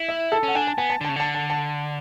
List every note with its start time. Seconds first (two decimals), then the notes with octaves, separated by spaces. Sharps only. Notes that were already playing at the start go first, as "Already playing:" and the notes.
Already playing: E4
0.08 E5
0.32 A4
0.43 C#4 F#5
0.55 D4 G#5
0.67 A5
0.78 B3 G#5
0.90 A5
1.01 D3
1.05 A5
1.09 C#3
1.16 D3 A5
1.35 A5
1.50 A5